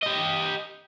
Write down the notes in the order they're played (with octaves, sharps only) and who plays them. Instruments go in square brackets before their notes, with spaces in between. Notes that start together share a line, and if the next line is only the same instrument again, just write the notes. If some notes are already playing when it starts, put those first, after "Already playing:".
[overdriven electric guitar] G4 D#5